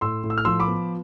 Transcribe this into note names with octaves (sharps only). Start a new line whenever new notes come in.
A2 C6 E6
A2
E6
F6
F3 C6 E6
B5 D6
B3